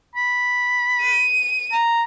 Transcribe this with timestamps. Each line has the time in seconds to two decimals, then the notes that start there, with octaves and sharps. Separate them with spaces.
0.16 B5
1.02 D#7
1.73 A#5